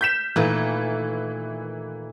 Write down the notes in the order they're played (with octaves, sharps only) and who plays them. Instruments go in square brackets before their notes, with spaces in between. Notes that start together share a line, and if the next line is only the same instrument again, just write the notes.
[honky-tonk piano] G6 B6 E7
[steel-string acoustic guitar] D#2 A#2 A3 [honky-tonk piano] E3